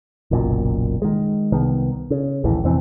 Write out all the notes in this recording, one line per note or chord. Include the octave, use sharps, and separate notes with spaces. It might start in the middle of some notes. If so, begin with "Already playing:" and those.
F#1 B1 F#2 A#2
D#3 G#3
C2 D#3 B3
C#3
A#1 D#2 A2 E3
F2 C3 E3 C4